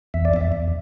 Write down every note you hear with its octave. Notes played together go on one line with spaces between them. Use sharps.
E2 E5
D5
E2 E5
E2